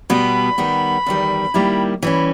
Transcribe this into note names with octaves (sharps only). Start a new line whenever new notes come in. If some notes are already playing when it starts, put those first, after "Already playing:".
B2 G3 B3 B5
D#3 G3 B3
E2 D#3 G3
D#3 G3 A#3 E4 G4
E3 G3 C#4 B5